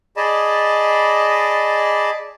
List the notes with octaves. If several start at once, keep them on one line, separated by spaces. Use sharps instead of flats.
G#4 D5 D#5 A5 B5